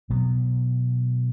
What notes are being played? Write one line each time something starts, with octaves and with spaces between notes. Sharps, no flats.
B2 F#3 B3